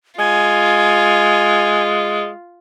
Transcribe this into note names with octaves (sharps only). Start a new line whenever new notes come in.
G#3 F4 G#5